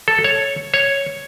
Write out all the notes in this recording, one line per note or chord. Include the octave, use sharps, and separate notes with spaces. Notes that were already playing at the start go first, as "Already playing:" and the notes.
A4
C#5
C#5